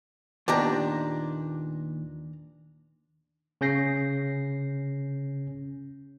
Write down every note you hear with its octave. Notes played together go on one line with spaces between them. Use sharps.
D#2 A#2 B3 D4 G4 A#5
C#3 C#4 G6 A#6 C7